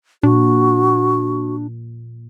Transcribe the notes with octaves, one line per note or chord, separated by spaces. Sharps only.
A#2 D4 F#4